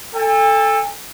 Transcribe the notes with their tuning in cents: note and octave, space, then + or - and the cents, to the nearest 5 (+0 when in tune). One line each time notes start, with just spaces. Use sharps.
A4 +0 G#5 -45